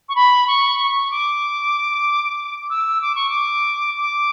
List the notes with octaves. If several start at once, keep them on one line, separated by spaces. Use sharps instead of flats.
C#6
B5
C#6
C#6
D6
E6
D6
C#6
D6
D6